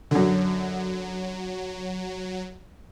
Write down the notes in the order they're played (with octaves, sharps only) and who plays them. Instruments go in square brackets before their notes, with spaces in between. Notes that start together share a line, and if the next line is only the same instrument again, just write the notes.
[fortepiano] F#2 D3 [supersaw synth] F#3